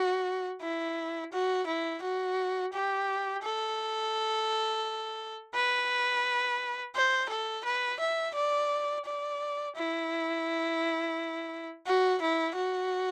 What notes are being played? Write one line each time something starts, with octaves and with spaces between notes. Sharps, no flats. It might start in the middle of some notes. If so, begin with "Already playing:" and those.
Already playing: F#4
E4
F#4
E4
F#4
G4
A4
B4
C5
A4
B4
E5
D5
D5
E4
F#4
E4
F#4